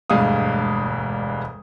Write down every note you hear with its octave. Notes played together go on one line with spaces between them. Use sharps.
E1 D2 G2 G#3 F5 D#6